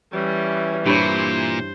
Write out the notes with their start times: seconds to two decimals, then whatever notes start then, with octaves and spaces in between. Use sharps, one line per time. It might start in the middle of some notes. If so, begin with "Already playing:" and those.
0.13 E3 G3 C#4
0.86 G2 A#2 E4 C5 C#5